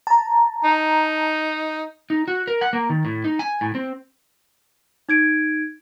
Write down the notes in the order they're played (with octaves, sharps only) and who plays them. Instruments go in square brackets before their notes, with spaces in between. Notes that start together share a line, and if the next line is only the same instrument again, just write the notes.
[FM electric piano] A5 A#5
[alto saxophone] D#4
[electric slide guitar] D#4
F#4
A#4
F#5
A#3
D#3
A2
D#4
G#5
A2
C4
[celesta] D#4 G#6 D7